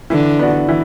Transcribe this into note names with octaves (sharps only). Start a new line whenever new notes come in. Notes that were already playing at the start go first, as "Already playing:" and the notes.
D3 E3
B3 D4 F#4
E3